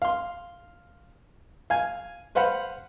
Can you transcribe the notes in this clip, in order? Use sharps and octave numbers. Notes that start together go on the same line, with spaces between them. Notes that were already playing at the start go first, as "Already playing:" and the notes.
F5 C6
F5 G#5
B4 C5 F5 F#5 B5